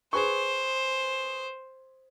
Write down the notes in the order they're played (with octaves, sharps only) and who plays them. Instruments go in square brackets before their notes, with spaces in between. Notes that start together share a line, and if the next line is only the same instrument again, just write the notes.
[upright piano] G#4 B4 C#6 [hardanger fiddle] C5